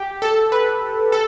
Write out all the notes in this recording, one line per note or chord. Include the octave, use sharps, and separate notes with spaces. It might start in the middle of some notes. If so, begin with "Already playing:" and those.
Already playing: G4
A4
B4
A4